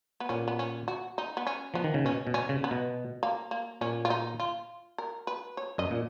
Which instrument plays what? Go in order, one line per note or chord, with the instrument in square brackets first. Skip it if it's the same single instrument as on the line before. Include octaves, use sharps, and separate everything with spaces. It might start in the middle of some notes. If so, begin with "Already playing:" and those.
[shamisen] B3
[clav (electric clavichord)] A#2 [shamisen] C#4
[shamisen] B3
C#4
F#4
D#4
B3
C#4
[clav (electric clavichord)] F3 [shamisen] B3
[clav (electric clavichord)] D#3
C#3
[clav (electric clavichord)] B2 [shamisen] C#4
[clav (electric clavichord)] B2
[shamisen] C#4
[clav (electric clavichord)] C#3
[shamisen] B3
[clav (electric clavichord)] B2
[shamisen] A#3
A#3
[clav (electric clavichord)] A#2 [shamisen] C#4
[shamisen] F4
D#4
F4
A#4
B4
C#5
[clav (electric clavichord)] F#2 [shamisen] D#5
[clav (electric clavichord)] A#2